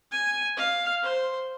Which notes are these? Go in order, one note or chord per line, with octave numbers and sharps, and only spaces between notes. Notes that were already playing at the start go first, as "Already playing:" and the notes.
G#5
F5
C5